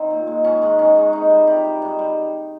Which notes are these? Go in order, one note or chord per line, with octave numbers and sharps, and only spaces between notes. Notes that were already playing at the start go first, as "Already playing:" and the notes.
Already playing: D#3 C4
A#2
G#3
G#2 C#4
D#3 G#3
G#2 C#4
D#3 G#3
C3 D#4
G3
C3 G4
G3
G#2
G3